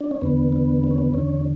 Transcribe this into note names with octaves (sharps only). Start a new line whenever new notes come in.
D4
C#4
E2 D3 B3
B3
B3
C#4
B3
E2 D3 C#4